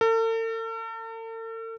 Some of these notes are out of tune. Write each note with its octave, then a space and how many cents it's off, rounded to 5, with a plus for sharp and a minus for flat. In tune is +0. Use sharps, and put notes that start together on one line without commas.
A4 +45